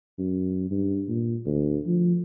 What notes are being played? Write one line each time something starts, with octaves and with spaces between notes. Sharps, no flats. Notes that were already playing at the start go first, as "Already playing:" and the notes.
F#2
G2
A#2
D2
F3